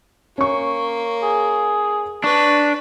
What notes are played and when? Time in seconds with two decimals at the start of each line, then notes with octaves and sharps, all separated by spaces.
0.38 A#3 C#4 C#6
1.22 G#4
2.24 D4 B4 C#5